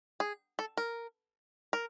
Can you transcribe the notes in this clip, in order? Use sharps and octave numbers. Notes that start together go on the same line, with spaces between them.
G#4
A4
A#4
A#4